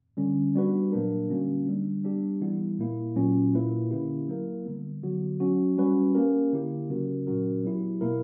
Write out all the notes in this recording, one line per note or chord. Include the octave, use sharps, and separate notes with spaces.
D3 G3 C#4
G3 B3 D4 F#4 B4
A#2 F#3 A#3 D4 A#4
D3 G3 A#3 C#4 F#4
D3 G3 B3 D4
G3 B3 D4 G4
E3 G3 B3 E4
A#2 A#3 E4
A#2 F#3 C#4
A#2 A#3 E4 B4
D3 A#3 C#4 E4 G4
F#3 A#3 E4 A#4
D3 G3 B3
D3 F#3 B3 F#4
F#3 C#4 F#4
G3 C#4 F#4 B4
A#3 C#4 G4 A#4
D3 A#3 E4 G4
C#3 F#3 C#4 F#4 A#4
A#2 F#3 C#4 F#4 A#4
F#3 B3 E4 G4
B2 A#3 E4 A#4